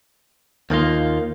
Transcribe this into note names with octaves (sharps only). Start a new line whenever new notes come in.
D#2 D#3 A#3 F4